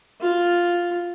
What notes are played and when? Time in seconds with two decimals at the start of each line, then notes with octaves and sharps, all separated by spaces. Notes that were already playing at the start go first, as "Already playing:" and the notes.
0.20 F4